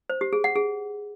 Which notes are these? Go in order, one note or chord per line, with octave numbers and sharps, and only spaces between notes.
C5
G4
G#4
F#5
G#4